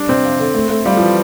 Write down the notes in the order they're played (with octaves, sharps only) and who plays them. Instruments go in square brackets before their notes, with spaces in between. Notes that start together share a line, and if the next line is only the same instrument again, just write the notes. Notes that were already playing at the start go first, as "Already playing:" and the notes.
Already playing: [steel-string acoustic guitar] G3 [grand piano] D4
[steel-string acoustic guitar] C3 [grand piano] C4
[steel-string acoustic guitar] F2
D3
A3
A3
[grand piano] G3 [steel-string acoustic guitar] F4
[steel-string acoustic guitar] E3 [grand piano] F3